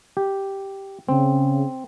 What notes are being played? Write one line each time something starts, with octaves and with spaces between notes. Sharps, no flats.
G4
C#3 C4